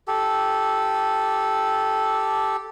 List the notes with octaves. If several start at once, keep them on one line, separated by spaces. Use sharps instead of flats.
G4 A4